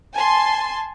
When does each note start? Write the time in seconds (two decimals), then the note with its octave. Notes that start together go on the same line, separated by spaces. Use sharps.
0.14 G#5 A5 C6